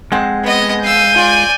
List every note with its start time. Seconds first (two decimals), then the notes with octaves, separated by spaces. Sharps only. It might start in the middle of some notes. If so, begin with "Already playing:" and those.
0.12 F2 G#3 C4 F#5
0.43 B3 D#5
0.83 F5 E6 G6 D#7
1.15 F4 D5 G#5